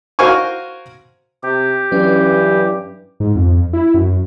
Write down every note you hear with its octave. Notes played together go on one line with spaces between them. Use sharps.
F#4 A#4 C5 F5 G#5 C#6
C3 G4
G2 E3 F#3 C#4
G#2
F2
E4
F#2